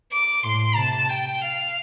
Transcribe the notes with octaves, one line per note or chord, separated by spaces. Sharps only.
D6
A2 C6
C3 A5
G5
F5